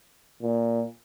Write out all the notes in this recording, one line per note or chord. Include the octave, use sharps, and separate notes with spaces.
A#2